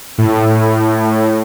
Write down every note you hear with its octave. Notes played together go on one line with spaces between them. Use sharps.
A2